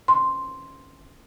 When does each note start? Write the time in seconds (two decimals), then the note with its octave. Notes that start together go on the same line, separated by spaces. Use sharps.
0.08 C6